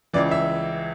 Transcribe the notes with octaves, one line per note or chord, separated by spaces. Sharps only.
C#2 C#3 E3 D5
E5